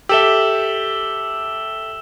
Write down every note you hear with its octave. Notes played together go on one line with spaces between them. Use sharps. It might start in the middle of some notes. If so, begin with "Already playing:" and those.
G4 A4 E5 E6 E7 G7